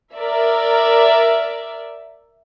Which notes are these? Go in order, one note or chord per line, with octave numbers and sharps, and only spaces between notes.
A#4 D5 E5